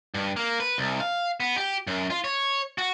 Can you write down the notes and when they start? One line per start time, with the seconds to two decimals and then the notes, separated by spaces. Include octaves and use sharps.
0.14 G2
0.37 A#3
0.60 B4
0.78 C2
1.00 F5
1.40 B3
1.57 G4
1.87 F#2
2.10 F4
2.24 C#5
2.78 F#4